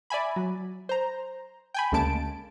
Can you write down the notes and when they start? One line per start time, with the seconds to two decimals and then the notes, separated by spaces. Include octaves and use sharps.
0.10 D5 E5 G#5 B5
0.36 F#3
0.89 C5 A#5
1.74 G5 G#5 B5
1.92 D2 C#3 G#3 A#3 A5 D7